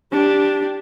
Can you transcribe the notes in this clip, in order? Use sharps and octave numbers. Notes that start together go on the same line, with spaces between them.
D4 G4